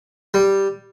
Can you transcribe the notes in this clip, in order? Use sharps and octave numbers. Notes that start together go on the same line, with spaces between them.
G3